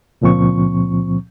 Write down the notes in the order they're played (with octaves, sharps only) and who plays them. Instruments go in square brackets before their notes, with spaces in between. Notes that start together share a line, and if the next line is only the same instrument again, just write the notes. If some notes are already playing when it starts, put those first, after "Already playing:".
[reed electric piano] C#2 A#2 F3 C4 C#6